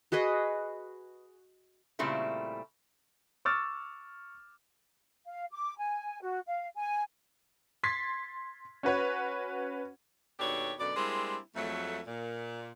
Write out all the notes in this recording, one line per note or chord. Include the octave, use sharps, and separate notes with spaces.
F#4 G#4 B4 D#5
A#2 C#3 G3 A3 C4 E4
C#6 D6 E6 F6 A6
F5
D6
G#5
F#4
F5
G#5
C6 G#6 A6 B6 C7
C#4 F#4 B4 C#5
D#2 B2 D4 G4 A4 C#5
F#2 B2 D3 D5
G3 G#3 A#3 C4 D4 E4
F2 F#3 G#3 A3
A#2